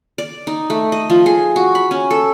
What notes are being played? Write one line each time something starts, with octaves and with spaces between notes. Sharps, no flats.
D5
D#4
A3
D#5
F3
G#4
F#4
B5
C#4
A4